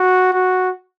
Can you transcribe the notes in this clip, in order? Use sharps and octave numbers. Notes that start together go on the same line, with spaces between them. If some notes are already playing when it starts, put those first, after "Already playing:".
Already playing: F#4
F#4